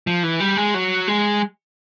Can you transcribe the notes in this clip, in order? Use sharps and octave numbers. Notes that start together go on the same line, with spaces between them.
F3
E3
G3
G#3
F#3
G#3